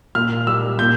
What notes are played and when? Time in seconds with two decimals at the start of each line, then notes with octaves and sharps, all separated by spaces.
0.15 A#2 F6
0.47 G3 E6
0.79 A#2 G6